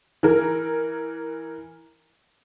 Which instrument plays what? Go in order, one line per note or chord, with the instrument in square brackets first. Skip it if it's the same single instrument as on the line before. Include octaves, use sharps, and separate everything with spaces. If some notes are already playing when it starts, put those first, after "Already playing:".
[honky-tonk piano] E3 A#4